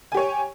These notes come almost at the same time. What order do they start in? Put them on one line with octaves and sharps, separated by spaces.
G#5 G4 C#5